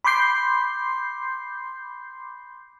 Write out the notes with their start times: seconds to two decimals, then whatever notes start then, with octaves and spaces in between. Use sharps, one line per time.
0.05 B5 C6 D6 G6 C7